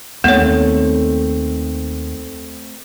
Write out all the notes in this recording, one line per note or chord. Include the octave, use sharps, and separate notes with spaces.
D#2 A3 B3 C4 C#5